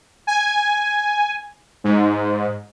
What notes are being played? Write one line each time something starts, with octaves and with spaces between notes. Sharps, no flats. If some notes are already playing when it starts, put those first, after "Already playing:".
G#5
G#2